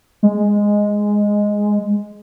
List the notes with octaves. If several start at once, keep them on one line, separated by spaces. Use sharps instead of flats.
G#3